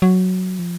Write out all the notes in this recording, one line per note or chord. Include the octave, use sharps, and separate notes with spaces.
F#3
F3